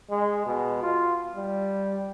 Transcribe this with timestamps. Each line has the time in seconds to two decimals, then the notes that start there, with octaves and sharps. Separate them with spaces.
0.10 G#3
0.46 B2
0.83 F4
1.36 G3